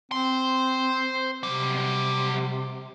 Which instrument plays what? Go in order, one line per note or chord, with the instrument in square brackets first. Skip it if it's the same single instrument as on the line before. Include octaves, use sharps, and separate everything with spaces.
[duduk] C4 [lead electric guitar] C5 C6
[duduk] C3 [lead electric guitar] F#3 G3